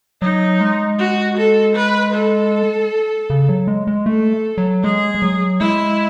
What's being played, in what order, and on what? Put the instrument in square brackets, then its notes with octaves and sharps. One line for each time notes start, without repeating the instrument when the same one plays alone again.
[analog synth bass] F#3 [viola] D#4
[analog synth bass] G#3
[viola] F#4
A4
B4
A4
[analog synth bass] C#3
F#3
G#3
G#3
[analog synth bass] A3 [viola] A4
[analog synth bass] F#3
[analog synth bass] G#3 [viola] G#4
[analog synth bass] G#3
F#3
[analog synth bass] G#3 [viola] E4